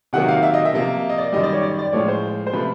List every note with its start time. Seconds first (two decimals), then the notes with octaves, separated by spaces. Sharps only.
0.13 C3 D#3 F#3 A#3 F#5
0.28 F5
0.43 E5
0.54 D#5
0.65 E5
0.73 C3 F3 A#3
1.09 D#5
1.18 D5
1.33 F#2 D#3 G3 D#5
1.43 D5
1.53 C#5
1.63 D5
1.79 D5
1.93 A2 F3 G#3 C#5
2.08 C5
2.47 C5
2.53 C3 F3 A3 B4